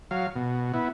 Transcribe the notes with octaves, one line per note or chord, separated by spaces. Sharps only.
F#3 F5
B2
B3 E4